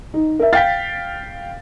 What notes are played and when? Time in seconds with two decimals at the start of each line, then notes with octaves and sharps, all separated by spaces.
0.14 D#4
0.39 A#4 E5
0.53 F5 G5 A6 B6